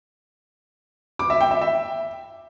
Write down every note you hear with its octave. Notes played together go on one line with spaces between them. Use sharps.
D6
E5
G5
E5
E5